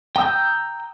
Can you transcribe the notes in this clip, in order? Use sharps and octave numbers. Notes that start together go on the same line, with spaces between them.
G5 A#5 D#6 E6 G6